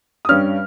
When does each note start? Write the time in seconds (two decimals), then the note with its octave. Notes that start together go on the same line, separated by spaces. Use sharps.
0.25 D#6
0.29 G2 G3 C#4 F6